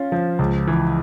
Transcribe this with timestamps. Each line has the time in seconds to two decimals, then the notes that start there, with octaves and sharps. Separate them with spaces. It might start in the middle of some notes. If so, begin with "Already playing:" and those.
Already playing: C#4 F4
0.12 F3
0.39 C#2
0.67 E3